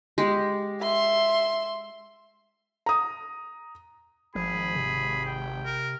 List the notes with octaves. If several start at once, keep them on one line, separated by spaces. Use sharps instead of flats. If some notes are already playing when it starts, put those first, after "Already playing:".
G#3 G4
E5 C6
A#5 D#6
G#1 F3 G#4 B5
C3
G5
A#4